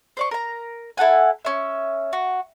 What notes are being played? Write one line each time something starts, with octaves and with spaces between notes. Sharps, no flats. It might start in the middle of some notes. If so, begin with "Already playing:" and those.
C5 D5 C#6
A#4 A#5
E4 A4 F#5 G#5
C#4 E5
F#4